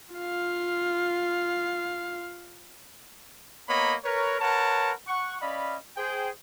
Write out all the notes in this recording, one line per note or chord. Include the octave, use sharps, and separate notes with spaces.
F4 F5
A#3 B3 C#5 D#5 A#5 B5
A#4 B4 C#5
A#4 B4 C#5 F#5 A5
F#5 C#6
C#4 D5 D#5 F5 B5
G#4 C5 G5